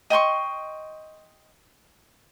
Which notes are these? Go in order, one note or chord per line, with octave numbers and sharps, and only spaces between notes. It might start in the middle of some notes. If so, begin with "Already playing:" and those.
D#5 G5 C6 C#6